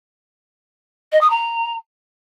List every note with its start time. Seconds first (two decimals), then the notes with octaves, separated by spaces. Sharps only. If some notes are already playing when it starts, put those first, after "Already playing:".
1.12 D#5
1.21 D#6
1.30 A#5